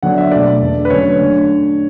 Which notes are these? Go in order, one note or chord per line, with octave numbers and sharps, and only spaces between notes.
D3 F#3 B3 D4 F#5
E5
B2 A3 D4 D5
E2 D3 A3 D4
B4
D3 F#3 A3 C#4 C#5
D3 A3 D4